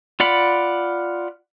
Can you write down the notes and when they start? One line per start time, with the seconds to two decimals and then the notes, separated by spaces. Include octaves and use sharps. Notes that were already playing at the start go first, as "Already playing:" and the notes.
0.20 F4 D5 F#5 B5